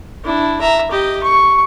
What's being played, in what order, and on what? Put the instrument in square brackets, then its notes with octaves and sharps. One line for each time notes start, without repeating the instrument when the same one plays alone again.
[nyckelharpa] D4 E4
E5 A#5
G4 D#5
C#6